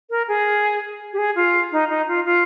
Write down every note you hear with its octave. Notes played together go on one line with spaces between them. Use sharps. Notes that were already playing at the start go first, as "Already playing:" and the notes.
A#4
G#4
G4
G#4
F4
D#4
D#4
F4
F4